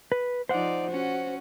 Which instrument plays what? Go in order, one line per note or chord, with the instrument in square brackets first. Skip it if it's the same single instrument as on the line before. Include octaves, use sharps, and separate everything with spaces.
[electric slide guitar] B4
[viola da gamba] F3 D#4 D5 [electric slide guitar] C5 F#5
[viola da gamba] C#4 F#4